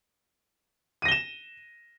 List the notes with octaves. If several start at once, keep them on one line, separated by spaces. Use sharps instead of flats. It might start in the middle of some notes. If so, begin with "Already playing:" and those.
A#6 D#7 E7 G7